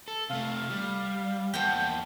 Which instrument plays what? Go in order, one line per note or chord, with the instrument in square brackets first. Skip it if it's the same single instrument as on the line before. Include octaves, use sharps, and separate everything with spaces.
[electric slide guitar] A4
[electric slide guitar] C3 A3 [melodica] F5
[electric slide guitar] G3
[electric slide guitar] E2 A#3 A5 [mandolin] C5 F#5 G5